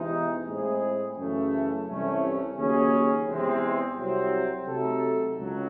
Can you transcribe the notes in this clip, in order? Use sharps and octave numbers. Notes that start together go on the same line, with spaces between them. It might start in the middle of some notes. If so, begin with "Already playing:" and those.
Already playing: E2 C3 E3 G#3 D#4
A2 G#3 C4 E4 G#4
F#2 C#3 E3 A3
C2 C3 E3 A3 C#4
D#2 C#3 F#3 C#4 G#4
E2 C3 E3 G#3 C4
C2 C3 F#3 C4
C3 F#3 A3 D#4 A4
C#2 C#3 F#3